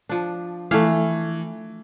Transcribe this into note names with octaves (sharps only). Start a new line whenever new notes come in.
F3 D4
E3 A3 F5